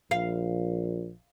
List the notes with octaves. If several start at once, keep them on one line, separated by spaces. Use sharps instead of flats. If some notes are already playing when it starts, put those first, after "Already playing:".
A#1 F5